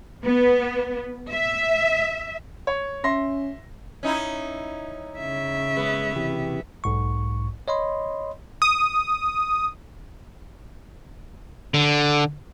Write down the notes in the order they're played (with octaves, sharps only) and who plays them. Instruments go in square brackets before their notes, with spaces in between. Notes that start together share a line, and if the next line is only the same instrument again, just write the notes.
[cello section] B3
E5
[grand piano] C#5
[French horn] C#4 [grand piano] E5 C6 A#6
[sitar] C#4 D#4 E4
[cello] C#3 E5
[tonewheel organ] G#3 [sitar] B3
[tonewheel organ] C3 E3 G4
[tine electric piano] B1 G#2 C#6
C#5 D#5 B5 C6
[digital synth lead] D#6
[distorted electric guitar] D3